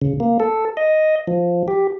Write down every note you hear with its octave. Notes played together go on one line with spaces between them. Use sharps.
C#3
A#3
A4
D#5
F3
G4